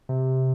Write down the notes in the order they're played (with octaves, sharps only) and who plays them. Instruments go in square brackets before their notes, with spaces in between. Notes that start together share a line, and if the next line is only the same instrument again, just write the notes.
[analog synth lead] C3